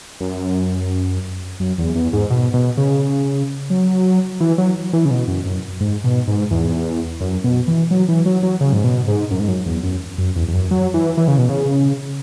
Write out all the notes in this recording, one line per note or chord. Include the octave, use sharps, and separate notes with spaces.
F#2
F#2
E2
E2
G#2
B2
B2
C#3
F#3
E3
F#3
E3
C#3
B2
F#2
F#2
G#2
B2
G#2
E2
F#2
B2
E3
F#3
E3
F#3
F#3
C#3
G#2
B2
G#2
F#2
G#2
F#2
E2
F#2
F#2
E2
E2
F#2
F#3
E3
E3
C#3
B2
C#3